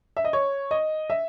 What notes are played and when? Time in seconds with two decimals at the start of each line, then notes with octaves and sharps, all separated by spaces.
0.17 E5
0.24 D#5
0.33 C#5
0.71 D#5
1.10 E5